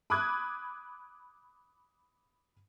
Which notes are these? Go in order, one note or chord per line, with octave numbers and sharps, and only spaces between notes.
B5 D6 D#6 F#6 G#6